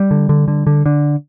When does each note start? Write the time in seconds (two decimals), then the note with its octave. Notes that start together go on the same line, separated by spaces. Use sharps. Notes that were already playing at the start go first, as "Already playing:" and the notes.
Already playing: G3
0.11 D3
0.29 D3
0.48 D3
0.67 D3
0.86 D3